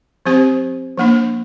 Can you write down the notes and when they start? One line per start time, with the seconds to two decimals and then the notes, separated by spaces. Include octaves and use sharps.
0.26 F3 C4 G4 C5
0.98 F3 A#3 D4